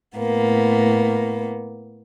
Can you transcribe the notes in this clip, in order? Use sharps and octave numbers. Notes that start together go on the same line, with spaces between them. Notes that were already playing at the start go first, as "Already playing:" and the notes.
A2 A#3 B3